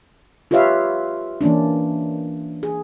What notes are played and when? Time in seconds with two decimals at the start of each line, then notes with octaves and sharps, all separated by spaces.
0.51 F4 G4 B4 C#5 E5 F5
1.41 E3 A#3 C#4 D4
2.63 G#4